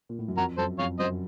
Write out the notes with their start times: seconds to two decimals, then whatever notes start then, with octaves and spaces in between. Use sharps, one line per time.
0.09 A#2
0.19 A2
0.28 F#2
0.37 F2 F#4 A#4
0.57 F#2 A4 C5
0.79 F2 C#5 F5
0.99 F#2 C5 D#5